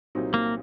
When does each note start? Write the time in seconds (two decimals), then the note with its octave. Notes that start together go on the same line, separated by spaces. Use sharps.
0.15 C2 A#2 F#3 C4 D#4
0.34 A#3